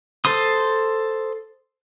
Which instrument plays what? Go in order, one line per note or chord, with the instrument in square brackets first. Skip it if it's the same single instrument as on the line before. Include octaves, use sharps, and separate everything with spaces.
[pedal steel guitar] A4 C5 C6 D#6